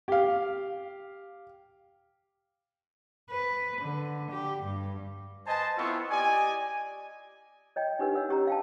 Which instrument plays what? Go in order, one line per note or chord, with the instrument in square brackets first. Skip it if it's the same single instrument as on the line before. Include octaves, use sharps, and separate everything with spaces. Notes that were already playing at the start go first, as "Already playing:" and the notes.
[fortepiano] G4 F5
[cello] B4
D3
G4
G2
[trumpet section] B4 C5 D#5 G#5 A5
B3 C4 E4 F4 A4 C#6
G4 D5 D#5 G#5
[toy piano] C#5 D#5 G5
D4 D#4 G4 A#4 B4 F#5
A#4 C#5 F#5 E6
C#4 G4 A#5
F5 G5 A5